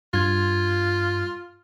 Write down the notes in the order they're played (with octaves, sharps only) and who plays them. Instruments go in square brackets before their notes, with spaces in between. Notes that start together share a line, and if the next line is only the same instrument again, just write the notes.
[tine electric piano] G2 G#6 [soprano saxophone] F4